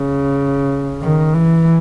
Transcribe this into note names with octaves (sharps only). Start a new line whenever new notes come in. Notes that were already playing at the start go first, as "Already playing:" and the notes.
Already playing: C#3
D#3
E3